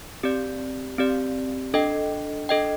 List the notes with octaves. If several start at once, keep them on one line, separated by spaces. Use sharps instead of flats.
C4 G4 D5
C4 G4 D5
D4 A4 D#5 G5
D4 A4 D#5 G5